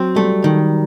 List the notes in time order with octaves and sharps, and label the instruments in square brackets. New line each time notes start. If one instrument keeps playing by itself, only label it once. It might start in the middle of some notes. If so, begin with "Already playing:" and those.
Already playing: [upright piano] F#3 [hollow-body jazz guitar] C4
[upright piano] G3 [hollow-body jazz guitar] A3
[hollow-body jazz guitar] D#3